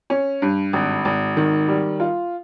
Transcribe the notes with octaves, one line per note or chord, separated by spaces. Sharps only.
C#4
G2
G#1
G#1
D#3
G3
F4